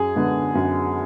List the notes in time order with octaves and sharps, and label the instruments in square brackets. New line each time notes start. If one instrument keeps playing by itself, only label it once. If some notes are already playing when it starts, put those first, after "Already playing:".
Already playing: [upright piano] F#2 [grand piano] G#4
[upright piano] D3 G#3 B3
F#2